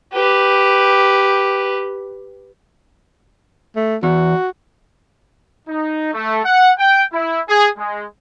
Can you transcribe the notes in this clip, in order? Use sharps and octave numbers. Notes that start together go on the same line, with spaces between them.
G4 B4
A3
E2 F#4
D#4
A3
F#5
G5
E4
G#4
G#3